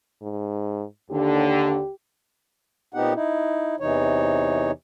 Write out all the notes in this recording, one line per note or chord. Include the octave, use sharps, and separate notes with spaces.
G#2
D#2 D3 G4
A#2 B3 C4 D#4 G4 F#5
D#4 E4
E2 C3 E3 D#4 C#5